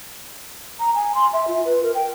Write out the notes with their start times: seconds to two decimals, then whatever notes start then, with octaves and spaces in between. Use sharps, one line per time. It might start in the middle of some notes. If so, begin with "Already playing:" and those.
0.79 A#5
0.95 G#5
1.15 C6
1.33 E5
1.48 F4
1.65 B4
1.83 A#4
1.95 G5